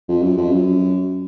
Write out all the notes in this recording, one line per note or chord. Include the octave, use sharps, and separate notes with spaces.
F2
F#2
F2
F#2